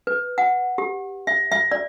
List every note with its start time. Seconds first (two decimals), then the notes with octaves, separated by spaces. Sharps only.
0.07 B4
0.38 F#5
0.78 G4
1.27 E5
1.52 E5
1.72 D5